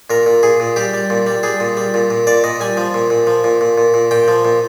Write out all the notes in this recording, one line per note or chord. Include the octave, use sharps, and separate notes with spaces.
A#2 A#4
A#2
A#2 G#4
A#2
G3 G4
G3
A#2
G3
G3 G#4
A#2
G3
A#2
A#2
A#2 D5
A#2 D#5
G3 G#5
F3
A#2
A#2
F3
A#2
A#2
A#2
A#2
A#2 G5
F3
A#2